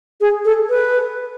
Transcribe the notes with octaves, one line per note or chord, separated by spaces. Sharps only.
G#4
A4
B4